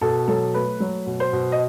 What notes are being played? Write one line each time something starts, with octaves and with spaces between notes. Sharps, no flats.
B2 A4
F#3 A4
A3 B4
F#3
B2
C5
B2
D#5